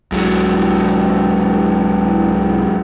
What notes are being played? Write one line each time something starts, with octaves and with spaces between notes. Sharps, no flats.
C2 G#2 F#3